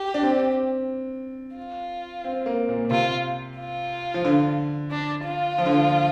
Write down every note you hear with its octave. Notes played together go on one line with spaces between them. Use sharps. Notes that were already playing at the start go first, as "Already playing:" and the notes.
Already playing: G4
D4
C4
F4
C4
A#3
A#2
A#2
C3 F4
F4
F3
D3
D4
F4
F3
D3
F3